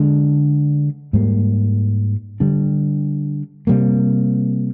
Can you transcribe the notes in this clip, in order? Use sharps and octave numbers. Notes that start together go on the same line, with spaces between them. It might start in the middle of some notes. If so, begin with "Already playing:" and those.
Already playing: D3 G#3 D4
G#2 G3 A#3
D3 G3 D4
C3 G3 A#3